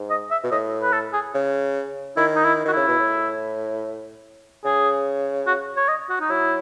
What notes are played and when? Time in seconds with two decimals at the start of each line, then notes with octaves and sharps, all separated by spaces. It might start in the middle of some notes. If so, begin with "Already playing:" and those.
Already playing: G#2
0.10 D#5
0.31 E5
0.44 B2
0.51 A2 D#5
0.82 B4
0.93 A4
1.13 G#4
1.34 C#3
2.17 D#3 E4
2.35 D#4
2.44 E4
2.65 D#3 F#4
2.72 C#3 E4
2.88 B2
2.99 A2
4.64 C#3 G#4
5.47 F#4
5.77 C#5
5.88 D#5
6.10 F#4
6.20 D#4
6.30 F#3 E4